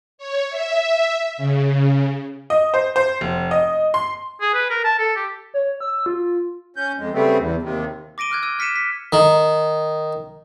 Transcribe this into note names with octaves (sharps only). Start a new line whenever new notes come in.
C#5
E5
C#3
D#5
C5
C5
F1
D#5
C6
G#4
B4
A#4
A5
A4
G4
C#5
E6
F4
C#4 G6
F2 G#3
C#3 G3 A3 B3 C4
E2
D#2 C3 D#3
D6 A#6 D7 D#7 G7
D6 F6 F#6 G#6
E6 G#6 D#7
F6 B6 C#7 D#7 E7
B6
D#3